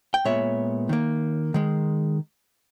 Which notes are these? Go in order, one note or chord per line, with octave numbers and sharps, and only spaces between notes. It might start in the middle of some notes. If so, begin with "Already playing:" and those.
G5
A#2 G#3 B3 C#5 E5
D#3 A#3
D#3 G#3